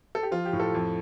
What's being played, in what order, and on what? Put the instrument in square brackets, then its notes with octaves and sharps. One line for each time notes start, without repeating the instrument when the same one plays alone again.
[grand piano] A4
G4
F3 F4
G4
A2
A4
F2